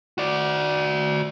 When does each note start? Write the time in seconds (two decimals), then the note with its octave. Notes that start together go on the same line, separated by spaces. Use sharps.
0.18 F#4 D5